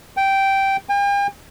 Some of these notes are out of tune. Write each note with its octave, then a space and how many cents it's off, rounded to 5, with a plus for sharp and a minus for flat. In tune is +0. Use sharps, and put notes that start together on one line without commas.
G5 -10
G5 +45